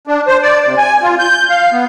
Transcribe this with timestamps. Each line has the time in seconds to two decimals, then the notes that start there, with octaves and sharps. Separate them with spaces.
0.07 D4
0.27 C5
0.42 D5
0.65 C3
0.77 G#5
1.02 F4
1.19 G6
1.49 F5
1.72 B3